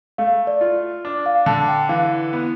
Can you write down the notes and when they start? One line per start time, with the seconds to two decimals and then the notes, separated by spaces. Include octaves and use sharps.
0.18 A3 F5
0.47 D5
0.61 F4
1.05 D4
1.26 F5
1.46 D3 A5
1.68 G5
1.89 E3 F5
2.33 B3